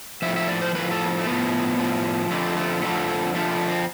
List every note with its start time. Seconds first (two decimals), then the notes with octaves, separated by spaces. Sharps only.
0.22 A2 F3 E5
0.36 E5
0.48 D5
0.61 C5
0.74 A2 F3 B4
0.91 A4
1.05 B3
1.09 C4
1.18 A3
1.27 A2 F3 B3
1.79 A2 F3
2.30 F2 D3 F3 A3
2.45 A3
2.56 A3
2.82 F2 D3 F3 A3
3.34 F2 D3 F3 A3
3.51 A3
3.68 C4